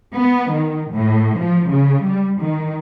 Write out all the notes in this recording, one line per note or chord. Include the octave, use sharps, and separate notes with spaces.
B3
D#3
A2
F3
C#3
G3
D#3